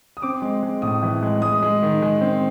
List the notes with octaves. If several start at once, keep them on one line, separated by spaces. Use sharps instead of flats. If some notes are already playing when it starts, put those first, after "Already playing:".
D#6
C4 D6
G#3
G#3
A2 D#6
E3
G#3
G#3 D#6
G#3
D#3
G#3
C4